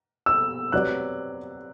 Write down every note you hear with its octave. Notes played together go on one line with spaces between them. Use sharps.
E6
F#3 C4 G4 B4 D5 F#6